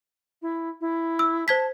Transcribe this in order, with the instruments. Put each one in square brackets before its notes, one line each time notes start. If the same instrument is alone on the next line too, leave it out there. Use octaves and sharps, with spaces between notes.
[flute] E4
E4
[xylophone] E6
[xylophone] C5 G#6 B6 [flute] A5